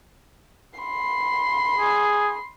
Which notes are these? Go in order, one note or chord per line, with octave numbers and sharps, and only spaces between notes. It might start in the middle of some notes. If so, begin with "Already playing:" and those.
B5 C6
G#4